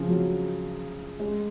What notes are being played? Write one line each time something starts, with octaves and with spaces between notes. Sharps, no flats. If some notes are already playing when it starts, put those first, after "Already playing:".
Already playing: C#3 F3
F#3
G#3